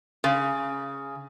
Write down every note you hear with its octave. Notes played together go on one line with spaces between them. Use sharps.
C#3